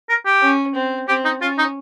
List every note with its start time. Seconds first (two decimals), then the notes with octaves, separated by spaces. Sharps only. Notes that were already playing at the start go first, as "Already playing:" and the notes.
0.09 A#4
0.26 G4
0.42 C#4
0.75 C4
1.09 C4 G4
1.25 D#4
1.41 C#4 F4
1.58 D#4